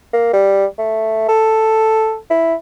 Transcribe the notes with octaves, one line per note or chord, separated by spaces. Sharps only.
A#3
G3
A3
A4
E4